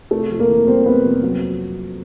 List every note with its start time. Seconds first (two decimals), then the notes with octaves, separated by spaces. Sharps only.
0.11 C3 A3 A4
0.31 F2
0.39 A#3 A#4
0.49 E3
0.67 G3 C4 C5
0.85 C3 B3 B4
1.04 F2
1.23 F#3